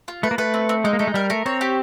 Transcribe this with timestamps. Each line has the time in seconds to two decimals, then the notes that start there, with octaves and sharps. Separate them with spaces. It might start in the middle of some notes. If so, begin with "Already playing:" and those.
0.08 F4
0.23 A3 B4
0.31 A#3
0.38 A3 B4
0.54 C4
0.69 C4
0.84 G#3 D#4
0.93 A#3
0.99 A3 D#4
1.07 G#3
1.14 G3 A#4
1.30 A3 A#4
1.46 C4 C#5
1.61 G4